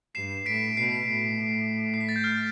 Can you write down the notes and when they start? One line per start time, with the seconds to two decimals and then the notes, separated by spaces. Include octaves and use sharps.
0.15 G2 C7 E7
0.46 A2 B6 D7
0.77 B2 C7
1.10 A2
1.94 C7
2.01 B6
2.09 A6
2.16 G6
2.24 F6